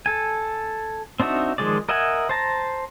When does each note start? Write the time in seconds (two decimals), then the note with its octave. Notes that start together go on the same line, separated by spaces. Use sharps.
0.06 A4 G#5
1.20 C4 D4 D#4 F#4 E5
1.58 D#3 F3 G#3 G#4 D5
1.89 A#4 D#5 E5 F#5 G#5
2.29 C5 A5 A#5